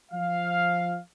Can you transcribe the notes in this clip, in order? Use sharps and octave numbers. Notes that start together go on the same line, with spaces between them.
F3 F5